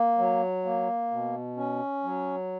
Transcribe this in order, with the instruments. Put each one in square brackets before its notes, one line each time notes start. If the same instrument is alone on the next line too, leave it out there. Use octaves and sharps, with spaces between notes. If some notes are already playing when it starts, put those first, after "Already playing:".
Already playing: [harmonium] A#3
F#3
A#3
B2
C#4
F#3